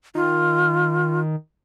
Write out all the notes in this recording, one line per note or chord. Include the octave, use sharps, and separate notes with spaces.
D#3 F4